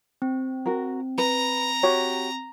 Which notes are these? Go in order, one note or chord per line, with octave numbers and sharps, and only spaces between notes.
C4
F#4 A#4
B4 A#5
F#4 G4 C#5